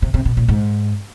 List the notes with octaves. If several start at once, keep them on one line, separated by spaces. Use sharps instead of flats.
C3
C3
B2
A#2
G#2